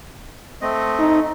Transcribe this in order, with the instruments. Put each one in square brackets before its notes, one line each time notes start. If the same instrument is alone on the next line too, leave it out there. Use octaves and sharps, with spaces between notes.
[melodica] A3 C4 D#5
[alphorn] D#4